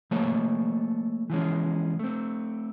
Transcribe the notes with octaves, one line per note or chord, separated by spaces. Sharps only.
F3 A3 A#3 A4 C#5
E3 F3 G#3 C#4
A3 C4